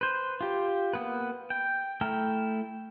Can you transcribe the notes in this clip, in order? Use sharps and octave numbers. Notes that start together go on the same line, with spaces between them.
B4 C5
F4 G4
A#3 B3 B4
G5
A3 E4 G5 A#5 F6